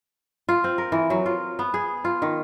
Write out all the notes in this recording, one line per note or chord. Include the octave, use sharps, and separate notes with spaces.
F4
C4
A#4
E3
F#3
F4
B3
G#4
F4
D#3